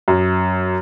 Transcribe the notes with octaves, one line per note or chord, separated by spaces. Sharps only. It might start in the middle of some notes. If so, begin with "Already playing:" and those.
F#2